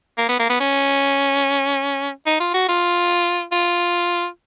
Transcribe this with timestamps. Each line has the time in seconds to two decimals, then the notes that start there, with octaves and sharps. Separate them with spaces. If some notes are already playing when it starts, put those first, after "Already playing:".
0.18 A#3
0.29 B3
0.39 A#3
0.50 B3
0.60 C#4
2.26 D#4
2.40 F4
2.54 F#4
2.69 F4
3.52 F4